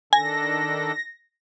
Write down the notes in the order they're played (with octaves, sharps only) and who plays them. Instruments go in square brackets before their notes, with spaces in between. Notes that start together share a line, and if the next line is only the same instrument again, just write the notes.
[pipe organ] D#3 D4 A4 [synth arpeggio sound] G#5 [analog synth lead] A#6